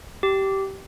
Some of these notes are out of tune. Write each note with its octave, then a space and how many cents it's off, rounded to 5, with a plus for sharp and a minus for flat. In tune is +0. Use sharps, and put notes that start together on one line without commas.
G4 -15